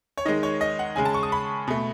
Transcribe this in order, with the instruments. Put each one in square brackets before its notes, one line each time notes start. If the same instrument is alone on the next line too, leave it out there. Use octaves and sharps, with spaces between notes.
[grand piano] C#5
D#3 G#3 D#5
C#5
D#5
F#5
C#3 G#3 G#5
A5
C#6
D#6
B5
B2 A3